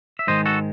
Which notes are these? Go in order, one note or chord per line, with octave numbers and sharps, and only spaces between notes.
E5
G#2 D#3 G#3 C5 D#5
F#4 A4